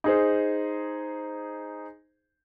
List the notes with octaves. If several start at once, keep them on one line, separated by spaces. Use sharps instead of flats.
D#4 G#4 C5